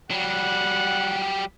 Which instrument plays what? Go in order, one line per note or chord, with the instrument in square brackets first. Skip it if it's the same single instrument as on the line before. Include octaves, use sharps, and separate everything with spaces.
[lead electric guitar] F#3 G3 [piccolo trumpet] F#5